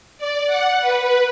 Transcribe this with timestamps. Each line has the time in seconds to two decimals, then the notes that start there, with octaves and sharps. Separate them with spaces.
0.18 D5
0.47 F#5
0.81 B4